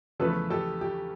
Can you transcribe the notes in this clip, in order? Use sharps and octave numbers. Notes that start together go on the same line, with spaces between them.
E2 C#3 F3 A3 A4 B4
G4 A4
G4